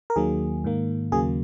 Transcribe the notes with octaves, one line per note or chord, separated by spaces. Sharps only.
A#4
D#2 D#3 F#3 A#3 G#4
G#2 D#3 A#3
D#2 C#3 F#3 A#3 G#4